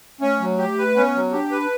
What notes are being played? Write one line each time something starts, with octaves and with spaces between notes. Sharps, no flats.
A3 C#4
F#3
G4
B4
B3 C#4
F#3
D4 G4
B4